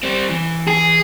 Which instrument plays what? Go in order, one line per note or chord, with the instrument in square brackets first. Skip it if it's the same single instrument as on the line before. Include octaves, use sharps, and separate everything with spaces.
[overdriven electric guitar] G3 C4
E3
[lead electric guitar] G#4